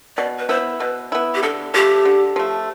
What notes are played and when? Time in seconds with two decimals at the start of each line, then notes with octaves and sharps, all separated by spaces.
0.17 B2 D5
0.39 B4
0.49 B3 E4 C5
0.80 B2 B4
1.12 B3 E4
1.35 G4
1.42 D3 A4
1.74 F3 A3 G4
2.05 D3
2.36 F3 A3